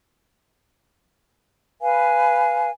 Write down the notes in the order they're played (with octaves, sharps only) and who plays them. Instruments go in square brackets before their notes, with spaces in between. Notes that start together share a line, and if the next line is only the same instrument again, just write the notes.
[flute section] B4 F5 G#5